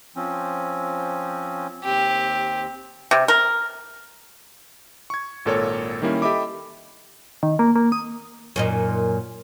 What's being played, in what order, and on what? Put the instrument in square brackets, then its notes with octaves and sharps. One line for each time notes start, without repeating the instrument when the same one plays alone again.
[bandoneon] F3 C4 C#4
[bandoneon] D#2 C4 [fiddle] G4
[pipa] C3
A#4
[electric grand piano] C#6 G#6
G#1 A#2 A4 A#4 C#5
D#3 G3 A#3 C#4 E4
G4 A4 D#5 E5 B5 D6
[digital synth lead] D#3
A#3
A#3
D#6
[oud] F#2 A#2 D#4